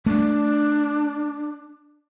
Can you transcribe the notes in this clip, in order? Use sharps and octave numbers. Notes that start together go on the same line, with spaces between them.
A3 D4